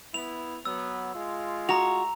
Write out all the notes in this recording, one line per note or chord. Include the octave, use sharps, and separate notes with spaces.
B3 E4 F7
F#3 B3 E6
G#3 F4
F#4 A#5 F7